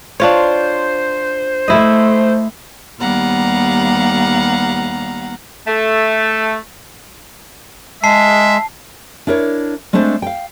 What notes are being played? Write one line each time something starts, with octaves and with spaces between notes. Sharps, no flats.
D4 F4 C5 C#5
A3 E4 D#5
D#2 G3 B3 F5 F#5 A#5
A3
G#3 E5 A5 C7
D4 E4 A#4 C5 C#5
G#3 A3 C4 D4 C5
F5 G5